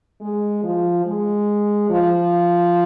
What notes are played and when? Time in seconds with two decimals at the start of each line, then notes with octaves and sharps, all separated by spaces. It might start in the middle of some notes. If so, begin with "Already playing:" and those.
0.21 G#3
0.63 F3
1.05 G#3
1.90 F3